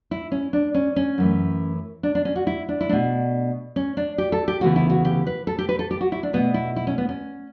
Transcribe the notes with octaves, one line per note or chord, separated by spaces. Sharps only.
E4
C#4
D4
C#4
C#4
F#2 E3 A3
D4
D4
C#4
F#4
E4
D4
E4
B2 A3 D4
C#4
D4
G4
A4
G4
D2 C#3 E3 B3 F#4
E4
F#4
G4
B4
A4
G4
B4
A4
G4
F#4
E4
D4
B2 A3 B3
E4
E4
C#4
B3
C#4